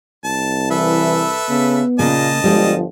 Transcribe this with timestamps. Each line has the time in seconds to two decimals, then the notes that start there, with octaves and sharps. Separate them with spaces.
0.24 C2 A5
0.70 E3 A4 B4 E5
1.49 C#3 B3
1.99 A#2 C#3 A#3 D#5 A5
2.44 G1 F3 G3 G#3 G#4